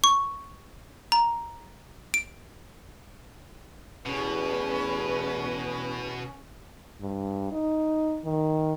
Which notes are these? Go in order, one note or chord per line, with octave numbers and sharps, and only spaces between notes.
C#6
A#5
D7
A1 E2 B2 C#4 B4
G2
D#4
D#3